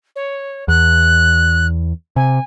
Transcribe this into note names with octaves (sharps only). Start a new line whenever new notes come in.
C#5
E2 F#6
C3 G#5